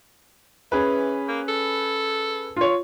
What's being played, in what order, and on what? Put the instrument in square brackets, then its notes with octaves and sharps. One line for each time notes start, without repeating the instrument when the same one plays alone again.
[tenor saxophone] E3 [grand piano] C#4 G#4 B4
[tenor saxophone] A#3
A4
[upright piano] F4 C#5